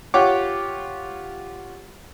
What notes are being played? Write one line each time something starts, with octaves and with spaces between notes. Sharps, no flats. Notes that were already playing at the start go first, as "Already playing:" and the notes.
F4 G4 C#5 F#5 D6